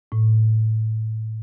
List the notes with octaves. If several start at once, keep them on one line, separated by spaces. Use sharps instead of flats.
A2